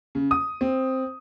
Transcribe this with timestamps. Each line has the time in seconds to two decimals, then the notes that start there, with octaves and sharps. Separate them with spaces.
0.15 C#3
0.31 D#6
0.61 C4